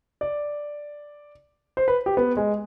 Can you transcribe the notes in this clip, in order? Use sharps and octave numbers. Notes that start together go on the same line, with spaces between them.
D5
C5
B4
G4
B3
G#3